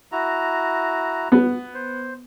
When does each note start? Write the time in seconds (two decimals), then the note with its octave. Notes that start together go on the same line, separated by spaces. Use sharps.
0.12 E4 F#4 A#5
1.32 B3
1.74 C5